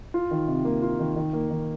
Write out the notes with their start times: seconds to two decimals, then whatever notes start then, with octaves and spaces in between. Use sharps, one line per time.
0.14 F4
0.31 D#3
0.48 C3
0.65 A#3
0.82 F4
1.00 D#3
1.16 D#3
1.33 A#3
1.50 D#3